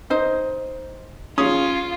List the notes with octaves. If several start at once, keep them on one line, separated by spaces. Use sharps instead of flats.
D#4 C5 D#5
C#4 F4 G#4 D#6